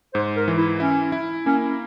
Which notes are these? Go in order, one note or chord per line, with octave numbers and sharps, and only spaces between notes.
G#2 C5
A#4
E3
E4
C#4 E4
E4
A#3 C#4